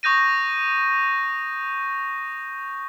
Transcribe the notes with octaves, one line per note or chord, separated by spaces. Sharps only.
C#6 D#6 G6 A#6 D#7